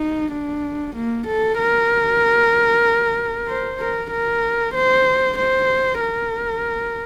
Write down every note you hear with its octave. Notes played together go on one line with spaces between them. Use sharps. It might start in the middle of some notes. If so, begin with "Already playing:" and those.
Already playing: D#4
D4
A#3
A4
A#4
C5
A#4
A#4
C5
C5
A#4